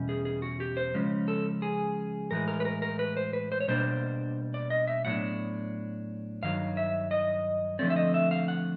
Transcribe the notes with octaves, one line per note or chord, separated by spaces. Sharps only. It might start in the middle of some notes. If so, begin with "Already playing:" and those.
Already playing: E2 B2 G3 C#4
G#4
G#4
F#4
G4
C5
C#3 F3 G#3 C#4
A4
G#4
A2 E3 G#3 A#4
A#4
B4
A#4
A#4
B4
C5
B4
C5
C#5
B2 G3 A#3 D4 C5
D5
D#5
E5
A2 F#3 B3 D4 F#5
G2 D#3 F#3 F5
E5
D#5
D3 F3 A3 C4 D5
E5
D#5
E5
F5
F#5